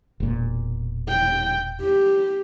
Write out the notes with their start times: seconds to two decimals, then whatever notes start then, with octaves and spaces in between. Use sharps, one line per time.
0.20 E1 A#2
1.08 G5
1.81 G4